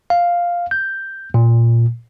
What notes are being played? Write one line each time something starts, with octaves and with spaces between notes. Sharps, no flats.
F5
G6
A#2